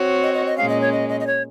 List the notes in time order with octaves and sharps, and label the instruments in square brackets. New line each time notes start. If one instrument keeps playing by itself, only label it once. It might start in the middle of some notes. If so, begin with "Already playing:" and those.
Already playing: [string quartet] C4 F#4 C#5
[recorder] D#5
D#5
D#5
[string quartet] A#2 G#3 C#4 [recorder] F5
[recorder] D#5
C#5
D#5
D#5
D#5
C#5